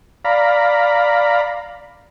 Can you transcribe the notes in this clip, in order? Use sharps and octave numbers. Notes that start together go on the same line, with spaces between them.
D5 F5 A#5 B5